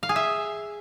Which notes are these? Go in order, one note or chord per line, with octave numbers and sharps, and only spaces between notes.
F5
G#4
E5